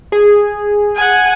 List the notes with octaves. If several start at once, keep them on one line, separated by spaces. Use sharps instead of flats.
G#4
F#5 G#5